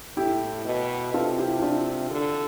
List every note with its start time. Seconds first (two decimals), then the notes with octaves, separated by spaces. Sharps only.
0.17 A2 E4 G4
0.65 B2
1.13 C3 F4 A4
1.38 E4 G4
1.57 E4
1.62 D4 F4
2.11 D3